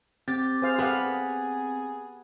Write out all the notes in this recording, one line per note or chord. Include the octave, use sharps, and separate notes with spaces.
C4 G4 A6
G#4 C5 F5
B3 G4 B4 F5